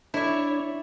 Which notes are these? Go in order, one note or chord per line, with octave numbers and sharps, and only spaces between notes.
D4 E4 C#5 D5 E5